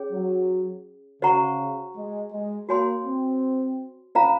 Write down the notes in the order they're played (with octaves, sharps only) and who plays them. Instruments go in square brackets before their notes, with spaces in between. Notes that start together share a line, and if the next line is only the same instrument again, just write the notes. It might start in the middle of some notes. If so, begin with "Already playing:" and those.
Already playing: [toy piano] C#4 G#4 C#5
[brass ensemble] F#3
[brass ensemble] C#3 [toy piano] F#4 C5 F#5 A#5 C#6
[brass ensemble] G#3
G#3
[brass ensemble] A#3 [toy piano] F#4 C#5 G#5 C6
[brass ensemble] C4
[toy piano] C#4 F4 C5 F5 A#5